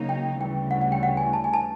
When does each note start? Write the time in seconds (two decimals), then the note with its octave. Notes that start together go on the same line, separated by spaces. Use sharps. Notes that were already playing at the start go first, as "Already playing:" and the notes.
Already playing: C#3 F#3 A#3 D#4
0.09 G5
0.40 D2 C#3 E3 G3 G5
0.71 F#5
0.81 F#5
0.92 G5
1.03 F#5
1.17 G#5
1.33 A5
1.44 G#5
1.54 A5